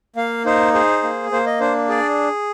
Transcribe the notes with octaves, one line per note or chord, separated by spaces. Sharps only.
A#3 F5
D#4 C5
G#4 C5
A#3
A#3 C5
D#5
D4 C5
G#4 D5